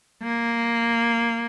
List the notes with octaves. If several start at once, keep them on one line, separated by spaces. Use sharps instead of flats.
A#3